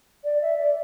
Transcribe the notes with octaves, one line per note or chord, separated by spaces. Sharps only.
D5
E5
D5